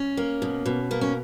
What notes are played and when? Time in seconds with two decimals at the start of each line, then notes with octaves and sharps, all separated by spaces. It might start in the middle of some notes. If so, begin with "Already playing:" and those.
Already playing: C#4
0.17 A#3
0.42 B2
0.66 B2
0.91 A#3 B3
1.01 C#4